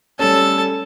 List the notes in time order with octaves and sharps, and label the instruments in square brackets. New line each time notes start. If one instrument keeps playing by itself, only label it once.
[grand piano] G3 A3 C#4 [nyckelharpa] A4 A5